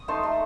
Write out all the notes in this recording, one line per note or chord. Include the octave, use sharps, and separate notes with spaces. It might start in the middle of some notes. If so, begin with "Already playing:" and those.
Already playing: D#6
A3 D#4 A5 C6
A3